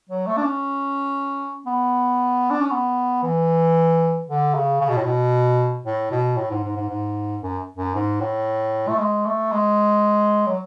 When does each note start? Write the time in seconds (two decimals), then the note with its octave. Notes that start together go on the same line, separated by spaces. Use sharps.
0.09 F#3
0.27 A3
0.37 D4
0.44 C#4
1.66 B3
2.50 D4
2.61 C#4
2.71 B3
3.23 E3
4.29 D3
4.54 C#3
4.81 C#3
4.89 B2
4.97 A2
5.05 B2
5.85 A2
6.11 B2
6.37 A2
6.51 G#2
6.64 G#2
6.76 G#2
6.89 G#2
7.42 F#2
7.77 F#2
7.95 G#2
8.21 A2
8.89 A3
8.99 G#3
9.26 A3
9.52 G#3
10.46 F#3